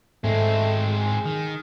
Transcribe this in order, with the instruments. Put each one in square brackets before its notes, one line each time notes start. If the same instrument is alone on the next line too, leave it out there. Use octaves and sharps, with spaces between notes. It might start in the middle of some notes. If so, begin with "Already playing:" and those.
[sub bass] G#2 [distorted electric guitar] G#3 C4 [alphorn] A3
[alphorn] G#4
[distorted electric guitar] D#3